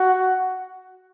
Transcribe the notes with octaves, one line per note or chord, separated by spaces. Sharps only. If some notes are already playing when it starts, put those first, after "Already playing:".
Already playing: F#4